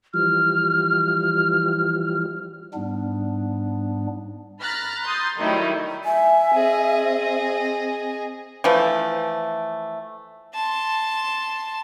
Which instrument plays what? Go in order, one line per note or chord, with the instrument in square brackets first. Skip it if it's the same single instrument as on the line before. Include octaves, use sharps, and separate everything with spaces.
[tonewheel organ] E3 F3 G3 [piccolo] F6
[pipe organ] G#2 G3 B3 D4
[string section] A#5 B5 F6 F#6 A6 B6
C6 D#6 G6 A6
D#3 F#3 G3 A3 D#4 E4
[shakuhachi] E5 [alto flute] G#5
[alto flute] C4 [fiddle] G#4 D#5
[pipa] E3 F3 A3
[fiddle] A5 C6